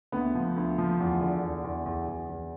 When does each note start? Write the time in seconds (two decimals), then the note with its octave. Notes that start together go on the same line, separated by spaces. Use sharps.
0.12 D2 B3
0.35 F3
0.56 D2
0.78 F3
1.00 E2
1.21 D3
1.42 E2
1.64 E2
1.86 E2
2.08 E2
2.29 E2